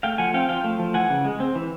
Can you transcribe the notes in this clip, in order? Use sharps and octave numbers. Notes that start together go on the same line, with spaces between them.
A3 F5 G5
F3 F#5 G#5
C4 F5 G5
F3 F5 G5
A3
F3
E3 F#5 G#5
C#3
G#3
C4
E3